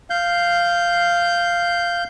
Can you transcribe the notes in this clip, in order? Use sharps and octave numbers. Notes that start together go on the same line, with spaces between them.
F5 G6